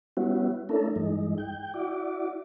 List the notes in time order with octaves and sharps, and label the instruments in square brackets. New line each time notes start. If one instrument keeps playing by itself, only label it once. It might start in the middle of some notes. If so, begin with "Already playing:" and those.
[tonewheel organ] G3 B3 C#4 E4 F#4
A3 C#4 D4 E4 A4 A#4
G2 E3 G#3 D#4
G5
E4 F#4 D5